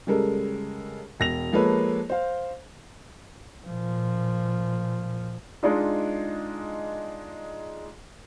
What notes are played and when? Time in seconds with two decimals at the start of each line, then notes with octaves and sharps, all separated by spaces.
0.07 C#3 G3 G#3 A4 A#4
1.20 E1 A#6 F7
1.53 F3 G#3 A#3 A4 B4 C#5
2.10 C5 F5
3.66 A#2 F3
5.63 G#3 D4 D#4 F4